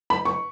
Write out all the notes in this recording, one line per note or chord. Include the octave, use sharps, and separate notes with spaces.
B5
C#6